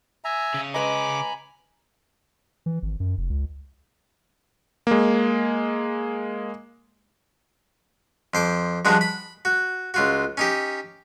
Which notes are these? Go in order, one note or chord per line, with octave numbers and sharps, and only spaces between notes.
E5 G#5 A#5
C#3 C#4
G#3 B4 D#5 G#5 A#5 B5 D6
E3
G#1
F#2
F1
C#2
G#3 A#3
F2 C5 D6
G2 F3 G#3 D4 F#4
B5
F#4
C#2 F4 F#4
C#4 D#4 G4